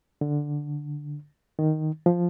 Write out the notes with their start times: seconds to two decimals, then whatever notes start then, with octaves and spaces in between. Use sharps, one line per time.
0.21 D3
1.59 D#3
2.06 F3